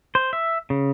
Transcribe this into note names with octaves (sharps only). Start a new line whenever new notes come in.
C5
E5
C#3